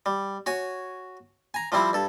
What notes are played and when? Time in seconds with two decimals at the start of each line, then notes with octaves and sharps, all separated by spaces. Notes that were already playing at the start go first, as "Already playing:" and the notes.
0.06 G3
0.46 F#4 C#5 G#5
1.54 G#5 A#5
1.72 F3 G3 C4 E4
1.93 G2 A4